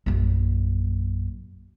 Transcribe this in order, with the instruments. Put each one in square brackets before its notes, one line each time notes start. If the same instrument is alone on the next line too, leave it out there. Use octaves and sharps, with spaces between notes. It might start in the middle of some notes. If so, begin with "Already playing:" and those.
[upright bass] A#1 F#2